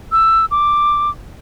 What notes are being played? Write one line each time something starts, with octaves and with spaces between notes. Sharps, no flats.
E6
D6